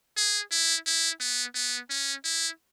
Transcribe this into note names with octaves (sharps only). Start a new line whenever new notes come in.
G#4
E4
E4
B3
B3
C#4
E4